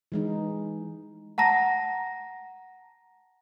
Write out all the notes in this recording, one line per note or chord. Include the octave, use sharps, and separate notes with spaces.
E3 G#3 D#4
F#5 A5 A#5 A#6